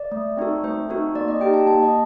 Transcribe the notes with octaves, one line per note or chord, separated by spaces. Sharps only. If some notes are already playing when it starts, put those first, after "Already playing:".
Already playing: D5
A3
C4 D#4 F#4 A4
A3 C5
C4 D#4 F#4 A4
A#3 D5
D#5
D#4 G4 G5
A5
A#3 A5
D#5